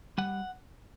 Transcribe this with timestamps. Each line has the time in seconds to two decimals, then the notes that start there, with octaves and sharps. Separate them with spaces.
0.18 G3 F#5